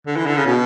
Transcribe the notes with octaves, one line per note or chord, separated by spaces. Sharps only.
D3
E3
D3
C#3
B2